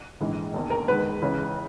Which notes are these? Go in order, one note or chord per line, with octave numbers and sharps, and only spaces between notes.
A#1 G#2 E3 G#3
E1 D#2 D#3
A#4
E2 D#3 G#3 B4
C#2 C#3 E3